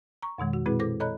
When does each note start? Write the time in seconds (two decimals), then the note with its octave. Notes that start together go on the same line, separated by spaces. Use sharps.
0.22 A#5 C#6
0.38 F2 B2 D#3 G#3
0.53 F#4
0.66 A#2 G#3 C4 E4 G#4 B4
0.79 E4 A4 C5 D6 A#6
1.00 A4 C#5 D#5 A#5 B5 F#6